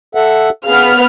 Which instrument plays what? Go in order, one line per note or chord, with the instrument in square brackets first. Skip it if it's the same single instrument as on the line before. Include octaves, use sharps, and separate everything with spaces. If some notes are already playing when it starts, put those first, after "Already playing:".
[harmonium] A4 E5 F#5
[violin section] B3 F6 [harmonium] G#4 F5